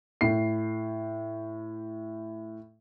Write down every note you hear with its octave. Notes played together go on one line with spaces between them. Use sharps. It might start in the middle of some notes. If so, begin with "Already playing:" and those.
A2 C7